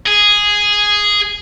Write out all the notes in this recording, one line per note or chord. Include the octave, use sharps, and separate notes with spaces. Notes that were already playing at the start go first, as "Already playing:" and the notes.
G#4